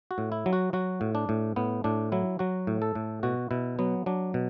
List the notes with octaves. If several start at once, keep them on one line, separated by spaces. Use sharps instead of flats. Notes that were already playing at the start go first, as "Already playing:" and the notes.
F#4
A2
E4
F#3
F#4
F#3 F#4
A2
D4
A2
A2 B3
A2 D4
F#3 E4
F#3 F#4
A2
A4
A2
B2 F#4
B2 E4
F#3 B3
F#3 D4
B2